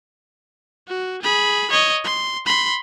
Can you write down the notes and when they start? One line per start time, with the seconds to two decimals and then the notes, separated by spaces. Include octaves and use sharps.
0.88 F#4
1.22 G#4 B5
1.71 C#5 D#5
2.05 C6
2.47 B5 C6